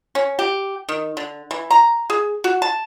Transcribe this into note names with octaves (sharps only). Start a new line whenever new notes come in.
C#4
G4
D#3
D3
E3
A#5
G#4
F#4
A5